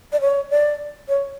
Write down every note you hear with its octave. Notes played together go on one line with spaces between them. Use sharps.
D5
C#5
D5
C#5